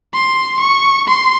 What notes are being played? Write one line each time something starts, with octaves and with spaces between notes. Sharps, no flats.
C6
C#6
C6